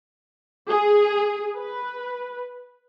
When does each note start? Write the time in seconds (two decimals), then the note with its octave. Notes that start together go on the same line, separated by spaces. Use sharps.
0.69 G#4
1.56 B4